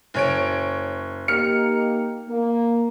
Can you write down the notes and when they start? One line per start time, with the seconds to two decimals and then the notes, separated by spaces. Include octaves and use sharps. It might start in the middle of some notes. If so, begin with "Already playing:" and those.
0.14 F#1 C#5 D7
1.28 A#3 D#4 G4 F6 C#7
2.28 A#3